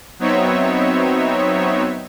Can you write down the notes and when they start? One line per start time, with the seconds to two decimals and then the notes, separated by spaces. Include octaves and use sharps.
0.19 F#3 B3 C4 D#4 C#5 E5